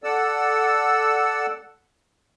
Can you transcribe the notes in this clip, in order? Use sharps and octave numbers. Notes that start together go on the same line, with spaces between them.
A4 D5 F#5 E6